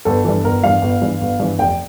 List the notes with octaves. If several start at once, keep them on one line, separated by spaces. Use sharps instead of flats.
G1 A4
G2 E3
G1 A#4
G2 E3 F5
G1
G2 E3
G1
G2 E3
F1 G5